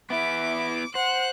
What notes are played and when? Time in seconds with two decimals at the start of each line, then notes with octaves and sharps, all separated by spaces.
0.10 B3 E4 E5 D6
0.95 C5 F#5 F#6